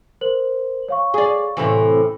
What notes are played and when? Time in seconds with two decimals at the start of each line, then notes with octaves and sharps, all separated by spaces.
0.21 A#4 C5 F#7
0.88 C#5 F5 C#6
1.14 G#4 D5
1.57 A2 C3 E3